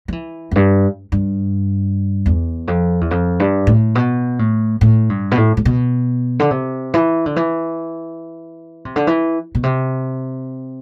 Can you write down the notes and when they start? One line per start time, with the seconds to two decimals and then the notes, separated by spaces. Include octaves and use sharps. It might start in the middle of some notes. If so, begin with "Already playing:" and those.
0.08 F3
0.12 E3
0.51 F2
0.56 G2
1.12 G2
2.26 E2
2.68 F2
3.01 E2
3.11 F2
3.40 G2
3.67 A2
3.95 B2
4.39 A2
4.81 A2
5.10 G2
5.31 B2
5.37 A2
5.57 A2
5.65 B2
6.40 D3
6.51 C3
6.94 E3
7.26 D3
7.36 E3
8.85 C3
8.96 D3
9.07 E3
9.55 B2
9.63 C3